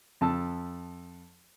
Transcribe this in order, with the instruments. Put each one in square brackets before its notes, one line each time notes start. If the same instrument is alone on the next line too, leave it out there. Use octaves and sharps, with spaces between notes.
[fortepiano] F2 A5 E6